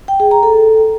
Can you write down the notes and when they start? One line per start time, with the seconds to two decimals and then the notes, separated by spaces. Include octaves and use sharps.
0.08 G5
0.20 G#4
0.31 A#5
0.43 A4